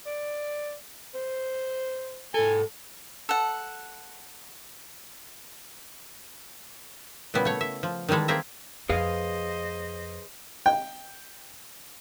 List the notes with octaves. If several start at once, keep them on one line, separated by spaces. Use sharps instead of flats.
D5
C5
G#2 A4 G#5
A4 F#5
A#2 C#3 G3 B3 E4
A3 C#5
E5
F3
D#3 E3 G3 G#3 A4
A#3 C4 G#4 E5 A#5
F2 G#4 B4 C5 D#5 F5
G5